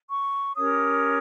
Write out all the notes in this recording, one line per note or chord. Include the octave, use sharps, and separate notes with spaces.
C#6
C#4 G4 A#4 C#5 D#6